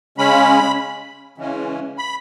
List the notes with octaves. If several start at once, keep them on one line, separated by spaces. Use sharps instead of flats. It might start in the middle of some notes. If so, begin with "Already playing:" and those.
C#3 G#3 C#4 B5
C#3 E3 G#3 C#4
B5